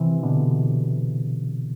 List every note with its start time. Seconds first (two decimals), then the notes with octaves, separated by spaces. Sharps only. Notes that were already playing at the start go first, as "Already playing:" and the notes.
Already playing: C3 E3
0.23 B2 D3